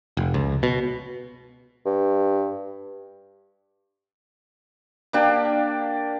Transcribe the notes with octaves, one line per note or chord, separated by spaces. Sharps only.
F1
C#2
B2
G2
A#3 D4 G4